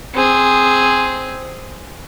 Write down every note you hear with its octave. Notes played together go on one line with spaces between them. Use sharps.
C4 G#4